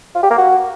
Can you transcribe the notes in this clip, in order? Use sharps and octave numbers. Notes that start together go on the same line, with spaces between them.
F4
G4
A#3
F#4